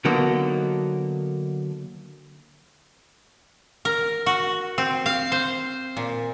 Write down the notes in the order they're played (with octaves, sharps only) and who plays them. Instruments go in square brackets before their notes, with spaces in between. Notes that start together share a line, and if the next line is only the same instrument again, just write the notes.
[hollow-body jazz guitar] D3 F#3 A#3 B3 D#4 F#4
[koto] A#4
F#4
C4
F5
C5
A#2